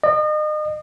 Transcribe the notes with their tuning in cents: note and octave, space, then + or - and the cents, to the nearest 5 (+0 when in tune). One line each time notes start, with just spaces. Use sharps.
D#5 -35